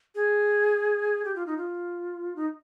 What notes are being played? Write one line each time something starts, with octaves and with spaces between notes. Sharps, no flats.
G#4
G4
F4
D#4
F4
D#4